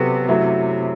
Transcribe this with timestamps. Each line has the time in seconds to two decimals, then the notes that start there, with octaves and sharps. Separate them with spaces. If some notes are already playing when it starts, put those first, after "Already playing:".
Already playing: C3 F#3 B3 F#4 A4
0.28 F#2 F#3 A3 E4